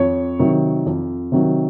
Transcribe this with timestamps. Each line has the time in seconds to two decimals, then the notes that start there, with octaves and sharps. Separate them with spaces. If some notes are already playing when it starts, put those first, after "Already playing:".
Already playing: F2 C#5
0.39 C3 D#3 F#3
0.86 F2
1.32 C3 D#3 F#3